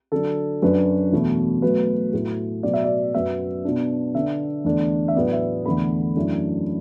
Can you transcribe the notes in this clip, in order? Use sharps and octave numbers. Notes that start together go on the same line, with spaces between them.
D3 F#3 D4 A4
F#2 F#3 D4 B4
E2 B2 A3
B2 F#3 A3 B4
A2 F#3 A3
B2 F#3 B3 D5
E5
D5
F#2 F#3 B3 E5
B2 B3 D4
D3 B3 D4 E5
E2 D3 A3 D4
E5
A2 F#3 B3 D4 D5
E5
E2 D3 A3 B5
F#2 E3 A3 D4